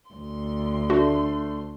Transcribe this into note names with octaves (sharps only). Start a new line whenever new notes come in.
D2 C6
A3 D4 F#4